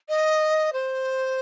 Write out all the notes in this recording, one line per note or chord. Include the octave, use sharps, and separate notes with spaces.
D#5
C5